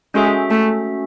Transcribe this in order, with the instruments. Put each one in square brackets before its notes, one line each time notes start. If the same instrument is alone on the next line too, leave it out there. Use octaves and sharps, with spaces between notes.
[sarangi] G#3 [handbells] C#4 F#4 A4 E5
[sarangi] A3